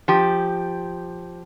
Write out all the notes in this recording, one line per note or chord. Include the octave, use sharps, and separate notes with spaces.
F3 G4